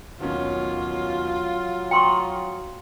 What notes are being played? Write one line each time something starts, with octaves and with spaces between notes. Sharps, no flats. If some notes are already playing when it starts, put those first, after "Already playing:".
D#2 B2 F#3 C#4 F4
G5 A#5 C6 C#6 D#6